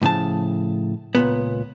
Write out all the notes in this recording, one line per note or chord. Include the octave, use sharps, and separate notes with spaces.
C2 A2 C#3 F3 A5
C#2 F#2 A#2 B3